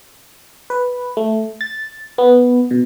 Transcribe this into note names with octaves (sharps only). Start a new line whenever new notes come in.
B4
A3
A6
B3
B2